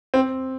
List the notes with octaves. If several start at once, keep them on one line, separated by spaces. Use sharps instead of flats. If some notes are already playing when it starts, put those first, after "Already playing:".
C4